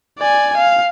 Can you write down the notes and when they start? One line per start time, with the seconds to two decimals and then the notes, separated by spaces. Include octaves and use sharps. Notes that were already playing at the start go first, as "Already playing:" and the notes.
0.19 D5 G#5
0.57 F5